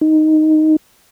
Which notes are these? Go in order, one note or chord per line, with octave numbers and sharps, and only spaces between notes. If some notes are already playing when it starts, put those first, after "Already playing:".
D#4